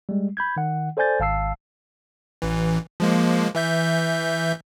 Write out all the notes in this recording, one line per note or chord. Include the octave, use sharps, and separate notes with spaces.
G3 G#3
B5 G6 G#6
D#3 F#5
A4 C5 D5 G#5 G6 A6
G#1 F5 A5 E6 C7
A1 E3
F3 G#3 A#3
E3 E5 G6